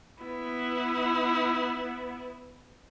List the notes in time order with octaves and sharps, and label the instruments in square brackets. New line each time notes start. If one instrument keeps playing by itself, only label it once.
[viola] B3 E4